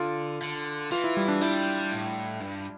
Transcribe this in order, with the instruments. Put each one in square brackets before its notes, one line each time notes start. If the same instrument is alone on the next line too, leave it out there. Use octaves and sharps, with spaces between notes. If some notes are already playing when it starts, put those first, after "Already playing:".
Already playing: [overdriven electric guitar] D3 [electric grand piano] F4
[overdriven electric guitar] D3
[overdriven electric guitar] E3 [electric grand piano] F4
[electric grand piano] E4
G3
D4
[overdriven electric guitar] G3 [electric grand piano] E4
[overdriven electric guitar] A2
G2